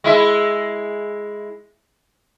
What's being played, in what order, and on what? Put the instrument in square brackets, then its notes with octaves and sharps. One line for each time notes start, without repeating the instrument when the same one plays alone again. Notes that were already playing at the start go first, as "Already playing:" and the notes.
[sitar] G#3 E4 E5